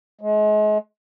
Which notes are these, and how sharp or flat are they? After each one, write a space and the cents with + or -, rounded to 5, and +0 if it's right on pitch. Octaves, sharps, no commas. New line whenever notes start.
G#3 +35